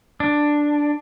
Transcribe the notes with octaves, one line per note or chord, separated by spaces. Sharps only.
D4